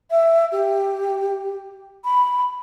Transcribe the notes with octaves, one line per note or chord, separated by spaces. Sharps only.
E5
G4
B5